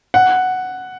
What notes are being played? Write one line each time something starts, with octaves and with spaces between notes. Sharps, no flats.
F#5